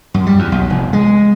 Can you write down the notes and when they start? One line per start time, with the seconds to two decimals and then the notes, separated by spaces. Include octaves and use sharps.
0.14 F#2
0.26 G3
0.39 E2
0.52 B1
0.70 F1
0.93 G#3